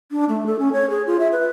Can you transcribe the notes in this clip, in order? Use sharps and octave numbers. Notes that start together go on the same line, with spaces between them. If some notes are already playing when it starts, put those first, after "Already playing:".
D4
A3
A4
C#4
C#5
G#4
F4
E5
B4